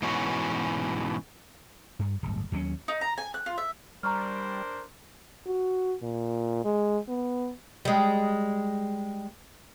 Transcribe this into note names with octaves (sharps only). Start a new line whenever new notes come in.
G#2 B2 E3 C#4 F#4
G2
D1 G1
D#2 F#3 G#3 C#4
D#4
A#5
G#5
F#6
F4
E5
G3 D4 A#4 C5 A#5 C#6 F6
F#4
A#2
G#3
B3
G3 G#3